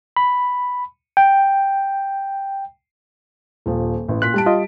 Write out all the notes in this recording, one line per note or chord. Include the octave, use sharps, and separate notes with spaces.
B5
G5
D#1 F3
A1
A#2 C6 F#6 B6
G3 A5 D7
F4 D#5